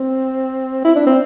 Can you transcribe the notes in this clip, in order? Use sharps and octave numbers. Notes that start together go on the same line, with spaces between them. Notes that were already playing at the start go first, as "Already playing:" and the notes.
Already playing: C4
E4
D4
C4